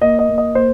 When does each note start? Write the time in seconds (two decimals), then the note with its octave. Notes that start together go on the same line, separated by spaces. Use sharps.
0.01 A#3 D#5
0.19 D#5
0.29 A#3
0.38 D#5
0.55 A#3 C5